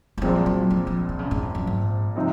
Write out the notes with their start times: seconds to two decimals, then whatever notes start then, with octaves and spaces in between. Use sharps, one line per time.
0.18 F#3
0.22 A#1 A#2 F3 G#3 C4
0.46 F#3
0.70 F3
0.87 F3
1.09 C3
1.19 C#3
1.31 G#2
1.42 F2
1.55 F#2
1.67 G#2
2.16 C3 F3 C4 D#4